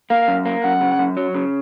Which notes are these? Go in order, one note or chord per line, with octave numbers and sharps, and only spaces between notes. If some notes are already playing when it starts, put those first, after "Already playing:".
A#3 F5
F#2
A#3
F#2 F#5
C#3
F#2
F#3
C#3